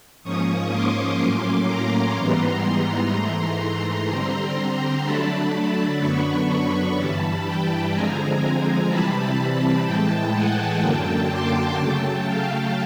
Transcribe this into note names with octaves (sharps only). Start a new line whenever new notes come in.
G#2 F3 A#3 C#4 C#6 D#6
C6 D6
A2 F#3 A#3 C#4
A#5 C6
G#2 E3 G3 B3 A#5 C6
G#2 E3 A3
D3 G3 C4 A#5 C6
D3 F#3 A3 D4 A5 B5
F#2 D3 F#3 B3 D4 B5 C#6
B5 C#6
G2 E3 G3 A5 B5
G5 A5
D3 F3 G#3 C4 G#5 A#5
C3 E3 G3 C4 A5 B5
A2 E3 G#3 G5 A5
F#5 G#5
F#2 D3 F#3 A#3 G5 A5
C6 D6
C#3 F#3 A3 G5 A5
F5 G5